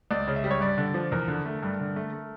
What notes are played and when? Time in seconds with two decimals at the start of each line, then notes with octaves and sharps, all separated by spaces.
0.11 C#2 D5
0.28 C#3
0.36 E5
0.44 G3
0.51 C#5
0.60 G2 D5
0.78 D3
0.94 F3
1.12 E2 A#4
1.28 D3
1.46 A3
1.63 G2
1.80 D3
1.96 A3
2.13 A3